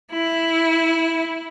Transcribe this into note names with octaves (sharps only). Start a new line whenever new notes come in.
E4